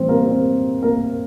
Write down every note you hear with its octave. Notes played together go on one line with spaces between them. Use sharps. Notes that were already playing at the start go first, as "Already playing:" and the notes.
Already playing: A2 E3 G3 C4 C5
A#3 A#4
C4 C5
A#3 A#4